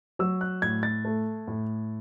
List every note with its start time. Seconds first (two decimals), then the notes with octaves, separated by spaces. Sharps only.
0.19 F#3 E6
0.41 F#6
0.62 A2 G#6
0.83 A6
1.05 A3
1.47 A2